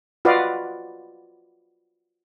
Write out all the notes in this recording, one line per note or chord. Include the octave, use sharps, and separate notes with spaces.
F4 F#4 B4 D5 D#5 F5